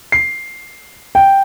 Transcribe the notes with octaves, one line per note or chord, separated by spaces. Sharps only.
C7
G5